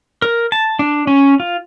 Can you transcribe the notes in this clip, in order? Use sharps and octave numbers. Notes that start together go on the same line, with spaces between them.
A#4
A5
D4
C#4
F4